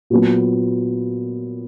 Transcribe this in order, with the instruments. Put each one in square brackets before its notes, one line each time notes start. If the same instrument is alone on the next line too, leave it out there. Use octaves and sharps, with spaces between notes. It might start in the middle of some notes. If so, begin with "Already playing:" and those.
[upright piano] A#2 F#3 B3